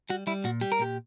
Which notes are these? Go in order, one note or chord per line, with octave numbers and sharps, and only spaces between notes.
G3 F#4
G3 E4
A#2 F#4
G3 G4
A#4
A#2 G4